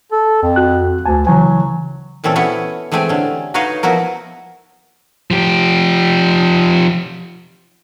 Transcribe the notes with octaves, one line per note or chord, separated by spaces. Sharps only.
A4
F2
F#4 F#6
D2 G#5 A5
C#3 E3 F#3 G#5
A#2 E3 C4 C#4 A4
B3 C#4 E4 F#4 C#5
E3 G#3 A3 C4 G4 G#5
D3 C#4
D#4 F#4 B4 C#5 D#5 F5
F3 B3 E4 F#4 A#4
F3 G4